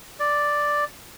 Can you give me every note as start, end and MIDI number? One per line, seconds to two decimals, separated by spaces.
0.20 0.84 74